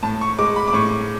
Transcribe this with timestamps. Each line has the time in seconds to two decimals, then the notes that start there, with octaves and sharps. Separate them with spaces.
0.03 A2 A5
0.21 C#6
0.39 G#3 D6
0.56 B5
0.68 D6
0.73 A2 C#6